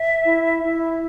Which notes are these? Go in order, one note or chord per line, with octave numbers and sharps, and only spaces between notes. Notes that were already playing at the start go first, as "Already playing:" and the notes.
Already playing: E5
E4
E4